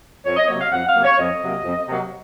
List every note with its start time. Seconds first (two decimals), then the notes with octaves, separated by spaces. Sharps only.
0.24 F2 C#5
0.36 D#5
0.47 C3 F#3 A#3 C#5
0.60 F5
0.71 F2 F#5
0.87 F5
0.94 C3 F#3 A#3
1.03 C#5
1.18 F2 D#5
1.41 C3 F#3 A#3
1.64 F2
1.87 C3 F#3 A#3